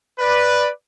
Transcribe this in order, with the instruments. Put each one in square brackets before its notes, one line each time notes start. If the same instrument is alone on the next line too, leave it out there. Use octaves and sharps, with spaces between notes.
[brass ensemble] B4 D5